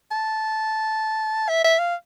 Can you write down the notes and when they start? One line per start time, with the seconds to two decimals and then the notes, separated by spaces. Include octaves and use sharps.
0.11 A5
1.49 E5
1.64 E5
1.79 F5